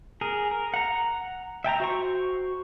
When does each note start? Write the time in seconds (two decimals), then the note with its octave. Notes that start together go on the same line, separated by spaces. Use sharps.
0.21 G#4 A#4
0.51 A#4
0.74 F#5 A#5
1.64 E5 G5 A5 A#5
1.80 F#4 C5 C#6